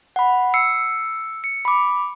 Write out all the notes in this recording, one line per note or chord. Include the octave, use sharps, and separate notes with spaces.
F#5 B5
E6 C7 C#7
C#7
B5 D6